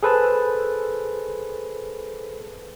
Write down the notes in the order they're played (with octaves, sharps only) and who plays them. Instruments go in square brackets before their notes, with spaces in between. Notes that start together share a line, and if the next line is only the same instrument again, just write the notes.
[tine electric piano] G#4 A4 B4 C5 A5